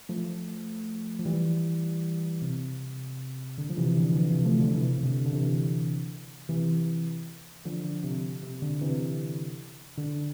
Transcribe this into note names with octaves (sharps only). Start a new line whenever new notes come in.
F3 A3
F3
E3 G3
C3
D3
F3
C3 E3
D3
E3
D3 F3
C3 E3
F3 A3
D3 F3
C3 E3
C3
D3
D3
C3 E3
C3 E3
D3 F3
D3
C3
C3
D3
C3 E3
D3